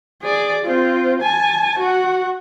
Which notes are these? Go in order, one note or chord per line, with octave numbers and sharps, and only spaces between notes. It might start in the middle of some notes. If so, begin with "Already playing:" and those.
G#4 D5
C4 F4
G#5 A5
F#4 F#5